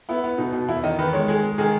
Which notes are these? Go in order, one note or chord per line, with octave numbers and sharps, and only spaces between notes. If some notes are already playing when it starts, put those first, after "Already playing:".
B3 E4
B3
B2 D#4
B2
E2 E4
D#3 D#5
D#3 B4
G#3 C#5
G#3 G#4
G#3
D#3 G#4